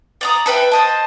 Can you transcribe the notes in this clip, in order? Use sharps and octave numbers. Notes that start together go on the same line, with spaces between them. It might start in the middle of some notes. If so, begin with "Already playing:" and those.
D5 A#5 D#6
A4 B4 E5 G5
C5 D#5 A5